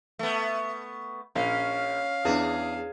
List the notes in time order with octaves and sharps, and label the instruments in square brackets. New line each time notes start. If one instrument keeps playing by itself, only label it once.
[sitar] A3 B3
[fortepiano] A#1 [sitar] C#4 [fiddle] F5
[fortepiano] E2 D4 [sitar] G#4